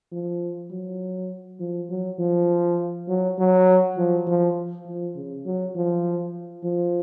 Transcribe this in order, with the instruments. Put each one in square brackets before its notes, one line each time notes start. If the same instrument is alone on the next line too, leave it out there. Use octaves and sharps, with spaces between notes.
[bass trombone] F3
F#3
F3
F#3
F3
F#3
F#3
F3
F3
F3
C#3
F#3
F3
F3